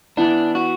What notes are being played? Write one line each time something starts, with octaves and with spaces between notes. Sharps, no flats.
E3 B3 D4 E4
F#4